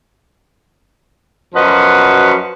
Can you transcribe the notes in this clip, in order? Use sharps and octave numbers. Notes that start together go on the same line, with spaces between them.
F#2 F3 F#4 B4 D#5